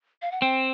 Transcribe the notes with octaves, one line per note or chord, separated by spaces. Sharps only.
F5
F#5
C4 G5